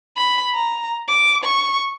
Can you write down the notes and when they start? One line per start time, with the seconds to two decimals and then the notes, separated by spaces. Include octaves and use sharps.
0.17 B5
0.54 A#5
1.08 D6
1.44 C#6